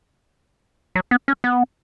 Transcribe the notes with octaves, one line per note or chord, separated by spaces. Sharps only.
F#3
B3
C#4
B3